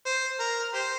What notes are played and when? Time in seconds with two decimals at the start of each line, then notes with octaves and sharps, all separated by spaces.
0.06 C5
0.39 A#4
0.73 G4 C5